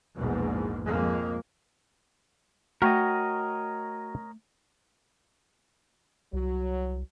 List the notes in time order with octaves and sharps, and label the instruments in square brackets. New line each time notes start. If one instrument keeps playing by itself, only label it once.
[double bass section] A#1 E2 G#2 B2
F2 G#3 A#3
[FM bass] A3 [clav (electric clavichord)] F#4 G5 [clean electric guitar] A#4 C#5 D#5
[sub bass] C2 [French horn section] F#3